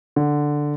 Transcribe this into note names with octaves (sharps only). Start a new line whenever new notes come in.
D3